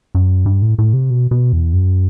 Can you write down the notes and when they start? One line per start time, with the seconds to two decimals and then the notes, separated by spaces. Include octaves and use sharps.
0.15 F#2
0.46 G2
0.62 A2
0.78 A2
0.93 C3
1.10 B2
1.31 B2
1.53 E2
1.73 F#2